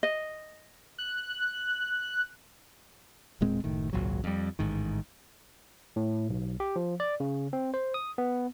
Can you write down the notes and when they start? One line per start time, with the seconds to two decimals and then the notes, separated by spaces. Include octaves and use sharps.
0.03 D#5
0.98 F#6
3.41 E1 A#2 G#3 C4
3.64 F#1 A2 D#3
3.93 G#1 C#2 A#2 F#3
4.24 F2 G3
4.59 A1 G#2 D#3
5.96 A2
6.30 B1
6.60 G4
6.76 F3
7.00 D5
7.20 C#3
7.53 C4
7.74 C5
7.94 D#6
8.18 B3